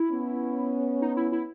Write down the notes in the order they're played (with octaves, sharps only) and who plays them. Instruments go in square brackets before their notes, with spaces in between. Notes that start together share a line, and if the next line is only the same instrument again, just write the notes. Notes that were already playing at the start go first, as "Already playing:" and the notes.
Already playing: [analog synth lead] E4
[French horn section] B3 C#4
[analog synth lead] D#4
E4
E4